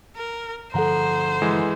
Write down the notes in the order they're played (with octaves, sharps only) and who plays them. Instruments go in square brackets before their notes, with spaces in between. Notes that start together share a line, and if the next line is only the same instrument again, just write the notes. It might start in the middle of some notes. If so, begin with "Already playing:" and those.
[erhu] A#4
[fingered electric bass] G2 D3 F3 [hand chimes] A4 F#5 A#5 [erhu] C5
[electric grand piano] E3 G#3